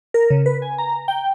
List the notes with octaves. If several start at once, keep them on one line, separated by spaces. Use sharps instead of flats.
A#4
C#3
B4
G#5
A#5
G5